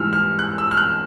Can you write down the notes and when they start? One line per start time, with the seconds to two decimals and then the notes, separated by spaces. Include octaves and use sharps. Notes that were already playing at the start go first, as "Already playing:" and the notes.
Already playing: G#2 E3 G3 E6 F6
0.13 F6
0.39 F#6
0.58 E6
0.71 F6
0.77 F#6